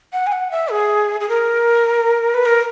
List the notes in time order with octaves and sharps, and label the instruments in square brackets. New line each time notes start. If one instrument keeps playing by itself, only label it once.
[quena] F#5
G#5
F#5
E5
G#4
G#4
A#4
B4
A#4